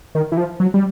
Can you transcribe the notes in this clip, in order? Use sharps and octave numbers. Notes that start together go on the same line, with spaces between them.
D#3
E3
F3
F#3
G3